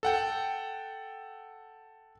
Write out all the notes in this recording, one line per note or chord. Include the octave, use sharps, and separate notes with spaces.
A4 F#5 G5